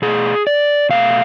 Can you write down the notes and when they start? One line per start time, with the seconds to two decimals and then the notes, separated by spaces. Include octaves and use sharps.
0.02 B2 A3 G#4
0.47 D5
0.89 B2 A3 F5